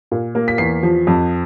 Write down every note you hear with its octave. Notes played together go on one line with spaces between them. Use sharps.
A#2
A#3
B6
E2 C7
F3
F2